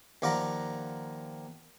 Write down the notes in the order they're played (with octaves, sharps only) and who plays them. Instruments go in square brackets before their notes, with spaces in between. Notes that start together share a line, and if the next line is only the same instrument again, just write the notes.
[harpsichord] D#2 F3 D5 F5 F#5 A#5